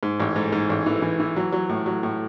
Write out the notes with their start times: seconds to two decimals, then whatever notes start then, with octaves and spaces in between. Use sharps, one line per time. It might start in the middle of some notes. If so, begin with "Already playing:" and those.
0.03 G#2
0.20 A1
0.36 G#2
0.52 G#2
0.69 A1
0.86 E3
1.02 E3
1.20 E3
1.36 F#3
1.53 F#3
1.69 A2
1.86 F#3
2.03 A2